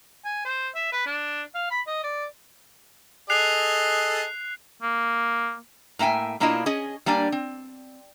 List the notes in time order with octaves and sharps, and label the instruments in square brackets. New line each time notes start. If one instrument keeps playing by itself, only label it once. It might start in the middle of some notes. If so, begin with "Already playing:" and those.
[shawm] G#5
C5
E5
B4
D4
F5
B5
D#5
D5
[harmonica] G#4 A4 D#5 [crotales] F#6 C7 F7
[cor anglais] A#3
[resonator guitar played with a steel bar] A2 A#3 E5 G5 G#5
B2 A#3 D4 E4 F4 D#5
C#4 G#4 D#5
G3 A#3 D4 D5 G#5
C4